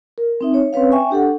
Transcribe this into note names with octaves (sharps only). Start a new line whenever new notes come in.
A#4
C4 D#4 E5
C#5
C4 C#4 B4 C#5 F5
E5 G5 G#5 C#6
D4 G4 A4 F#5